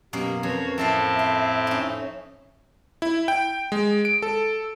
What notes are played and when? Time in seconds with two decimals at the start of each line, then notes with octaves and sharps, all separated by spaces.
0.13 F#2 B2 A#3 G4
0.43 F2 F#4 B4 C#5
0.78 A2 F3 C4 A4 E5 F5 A5
1.19 C5
1.67 C#4 D#4
3.02 E4
3.28 G5
3.72 G#3
4.05 D7
4.22 A4